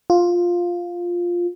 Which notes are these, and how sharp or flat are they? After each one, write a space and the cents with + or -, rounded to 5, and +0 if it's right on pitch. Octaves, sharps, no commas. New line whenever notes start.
F4 +5